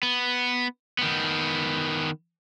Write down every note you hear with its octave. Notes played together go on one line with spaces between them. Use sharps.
B3
D#3 B3